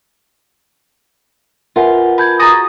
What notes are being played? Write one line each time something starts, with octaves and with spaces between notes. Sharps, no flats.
F4 A#4 B4 E5 F#5 G#5
A5 B5 G6 G#6
F#4 G#4 A#5 D#6 A6 A#6